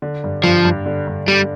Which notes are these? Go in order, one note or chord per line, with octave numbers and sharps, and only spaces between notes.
D3
G2
G2 F3
G2
D3
G2
D3 G3